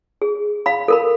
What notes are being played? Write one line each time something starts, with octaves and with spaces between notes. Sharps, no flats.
G#4
F5 B5
A4 A#4 B5